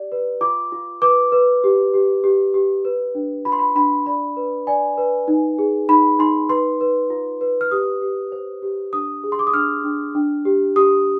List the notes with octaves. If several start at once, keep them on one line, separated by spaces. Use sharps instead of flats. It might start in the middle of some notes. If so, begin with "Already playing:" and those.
Already playing: G4 D5
B4
F4 D6
F4
B4 D6
B4
G4
G4
G4
G4
B4
D4
F4 B5
C6
B5
D4 B5
D5 B5
B4
D5 G#5
B4
D#4
G#4
D#4 B5
D#4 C6
B4 C6
B4
F4
B4
F6
G4 D#6
G4
C5
G4
D4 D#6
G#4
C6
D6
D#6
D4 F6
D4
D4
G4
G4 D#6